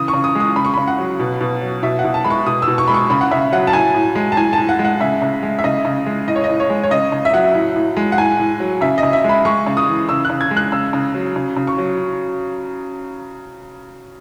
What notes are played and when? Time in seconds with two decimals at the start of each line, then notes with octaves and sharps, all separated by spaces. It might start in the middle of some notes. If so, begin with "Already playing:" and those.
Already playing: C#3 E3 D#6
0.08 C#6
0.14 C#3
0.24 D#6
0.35 G#3 D#6
0.56 C#3 B5
0.65 C#6
0.74 C#3 B5
0.88 F#5
0.98 F#3
1.19 B2
1.40 B2
1.61 F#3
1.83 B2 E5
1.99 F#5
2.04 B2
2.14 A5
2.24 G#3 B5
2.30 C#6
2.46 B2 D#6
2.62 E6
2.67 B2
2.78 C#6
2.88 G#3 B5
2.94 C#6
3.10 C#3 B5
3.21 F#5
3.31 C#3 E5
3.52 F#3 F#5
3.67 A5
3.73 A2 G#5
3.94 A2
4.15 G#3
4.32 A5
4.37 A2 G#5
4.53 A2 A5
4.69 F#5
4.79 G#3
4.85 F#5
5.01 C#3 E5
5.22 C#3
5.43 G#3
5.59 E5
5.64 C#3 D#5
5.85 C#3
6.06 G#3
6.27 A2 D#5
6.36 C#5
6.44 A2 D#5
6.60 C#5
6.70 G#3
6.83 C#5
6.91 C#3 D#5
7.12 C#3
7.25 E5
7.33 F#3 F#5
7.54 A2
7.75 A2
7.97 G#3
8.12 F#5
8.18 A2 G#5
8.39 A2
8.60 F#3
8.81 C#3 E5
8.98 D#5
9.03 C#3
9.13 E5
9.24 G#3
9.29 B5
9.45 G#3 C#6
9.66 C#3
9.77 D#6
9.88 E3
10.09 C#3 E6
10.25 C#3 F#6
10.41 G#6
10.51 G#3
10.57 F#6
10.72 C#3 E6
10.93 C#3
11.15 F#3
11.36 C#3
11.57 C#3
11.67 C#6
11.78 F#3